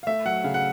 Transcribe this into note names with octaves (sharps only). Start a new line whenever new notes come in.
F5
A3 E5
F#3 F#5
C#3 F5
F#5